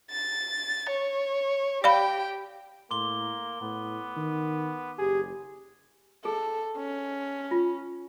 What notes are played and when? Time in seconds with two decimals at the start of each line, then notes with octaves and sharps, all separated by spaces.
0.11 A6
0.90 C#5
1.84 G4 D5 F5 G5 B5
2.91 A2 A#3 C6 D6 G7
3.61 A2 B3
4.16 D#3
4.99 F#1 G4 G#4
6.25 G#4 A4
6.77 C#4
7.51 F4